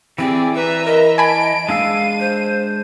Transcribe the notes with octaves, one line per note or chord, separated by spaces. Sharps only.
E3 C4 G4 G#4 D5
B4 E5 A#5
A#4 D#5
G#5 A5 B5 D7
G#3 D4 F5 E6 D#7
C5